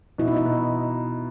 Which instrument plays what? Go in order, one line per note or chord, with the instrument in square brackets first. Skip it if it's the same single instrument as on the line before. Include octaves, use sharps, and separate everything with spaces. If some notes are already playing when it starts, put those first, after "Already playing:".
[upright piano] B2 [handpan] E4
[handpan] D#4
E4
[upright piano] B2